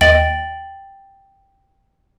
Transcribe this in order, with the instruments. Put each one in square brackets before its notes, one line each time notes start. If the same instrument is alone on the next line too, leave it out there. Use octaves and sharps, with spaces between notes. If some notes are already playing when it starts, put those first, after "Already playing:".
[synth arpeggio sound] D#2 D#5 [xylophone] G5 A6 F#7